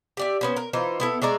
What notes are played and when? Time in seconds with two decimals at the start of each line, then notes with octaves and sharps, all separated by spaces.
0.17 G4 D5 E5
0.41 B3 C#4 C5
0.57 A#4
0.73 E3 D#4 F4 C5
1.00 B3 E4 A4
1.22 G#3 A3 D5 A#5